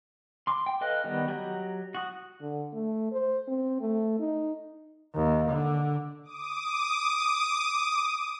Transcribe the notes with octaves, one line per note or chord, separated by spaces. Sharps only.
C6 D6
G5
A4 B4 D#5 F5 F#6
D#3 G3 B3 D#4
F#3 G4 D#5 A#5 G6
F#4 D#6
D3
A3
C5
C4
A3
D#4
D#2
D3
D6 D#6